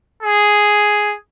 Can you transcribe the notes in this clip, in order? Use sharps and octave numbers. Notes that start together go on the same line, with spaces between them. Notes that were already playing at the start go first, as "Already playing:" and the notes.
G#4